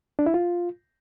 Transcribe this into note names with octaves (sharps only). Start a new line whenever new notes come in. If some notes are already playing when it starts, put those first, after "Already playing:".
D4
E4
F4